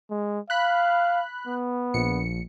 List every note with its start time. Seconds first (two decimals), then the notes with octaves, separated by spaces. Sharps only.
0.10 G#3
0.50 F5 B5 F#6
1.47 B3
1.94 A#1 C#7